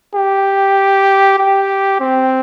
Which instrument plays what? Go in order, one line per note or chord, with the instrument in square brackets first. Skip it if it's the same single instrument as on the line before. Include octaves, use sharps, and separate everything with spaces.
[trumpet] G4
G4
C4